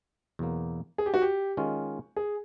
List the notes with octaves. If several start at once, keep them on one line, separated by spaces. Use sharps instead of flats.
E2 B2 F#3 A#3
G#4
G4
F#4
G4
D#3 G#3 C#4 F4
G#4